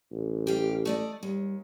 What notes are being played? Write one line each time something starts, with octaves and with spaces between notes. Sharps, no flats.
A1
G4 F5
A3 D5 D#5
D#2 G3